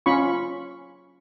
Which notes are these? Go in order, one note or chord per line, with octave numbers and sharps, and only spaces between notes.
C#4 F4 B5 C#6